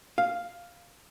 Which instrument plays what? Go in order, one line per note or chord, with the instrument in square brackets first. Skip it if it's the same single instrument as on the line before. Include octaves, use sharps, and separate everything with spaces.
[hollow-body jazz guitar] F5